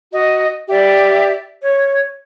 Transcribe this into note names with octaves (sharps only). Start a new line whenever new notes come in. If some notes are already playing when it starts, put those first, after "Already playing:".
F#4 D#5
G4 D5 E5
C#5